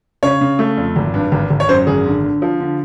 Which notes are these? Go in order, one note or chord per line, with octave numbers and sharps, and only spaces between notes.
C#3 C#5
C#3
A3
F2
G#1
G2
G#1
G#1
C#5
F#2 C5
G#1 G#4
D3
D3
F3
D3